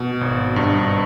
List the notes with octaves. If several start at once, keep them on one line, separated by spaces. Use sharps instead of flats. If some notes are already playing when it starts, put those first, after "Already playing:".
Already playing: B2
G#1
G2